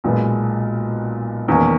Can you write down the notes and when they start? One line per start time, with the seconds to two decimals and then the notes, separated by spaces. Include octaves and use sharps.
0.04 B1 A#2 G#3 B3
1.48 E1 E2 D#3 A#3 C#4